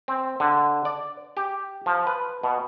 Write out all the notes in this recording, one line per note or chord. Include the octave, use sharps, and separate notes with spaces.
C4
D3
D5
G4
F3
B4
B2